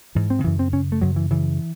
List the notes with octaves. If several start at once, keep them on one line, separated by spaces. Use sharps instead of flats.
G#2 E3
C4
D#3
F#2 C#3 E3
C4
F#2 C#3 C#4
A3
F#2 C#3 F#3
E3
F#2 C#3 E3